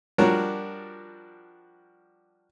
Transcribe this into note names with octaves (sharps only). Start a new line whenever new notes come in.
F3 G3 D4 F#4 A#4 C#5